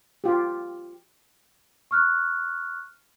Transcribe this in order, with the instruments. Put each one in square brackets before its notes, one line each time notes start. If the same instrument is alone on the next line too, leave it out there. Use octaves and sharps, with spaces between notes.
[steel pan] F4 G4
[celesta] C#6 F6 F#6